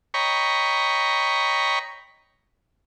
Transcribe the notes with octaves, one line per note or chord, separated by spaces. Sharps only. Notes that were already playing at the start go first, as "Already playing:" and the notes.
C#5 D#5 G5 A#5 B5 C#6